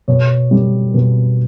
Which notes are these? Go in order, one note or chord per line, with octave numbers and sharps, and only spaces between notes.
B2 C#5
G3
B2